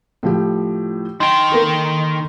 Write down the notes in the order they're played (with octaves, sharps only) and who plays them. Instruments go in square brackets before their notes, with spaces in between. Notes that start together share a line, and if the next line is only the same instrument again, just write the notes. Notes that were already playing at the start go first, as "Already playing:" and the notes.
[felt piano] A2 F3 G4
[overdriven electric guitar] D#3 G5 [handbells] C6
[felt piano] A#3 A4